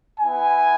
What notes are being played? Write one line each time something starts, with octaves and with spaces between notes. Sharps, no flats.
B3 E4 G#5